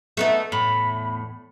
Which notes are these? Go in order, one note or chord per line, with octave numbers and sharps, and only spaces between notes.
A3 B3 D#4
E2 A2 B5